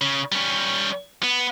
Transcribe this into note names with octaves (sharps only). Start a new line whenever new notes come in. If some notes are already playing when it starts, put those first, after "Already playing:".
C#3
G3 C#4
B3